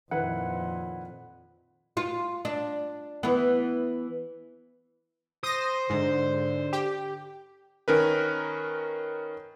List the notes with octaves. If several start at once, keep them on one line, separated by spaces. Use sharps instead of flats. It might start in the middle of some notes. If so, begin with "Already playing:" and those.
F2 A#2 D#3 E4 B4 F#5
F4
D4
E3 B3
C5 D#6 A#6
G#2 D3
G4
D#3 C#4 A#4 B4